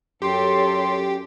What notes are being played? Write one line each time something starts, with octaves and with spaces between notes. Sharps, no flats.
F#2 G4 A4 C#5 C6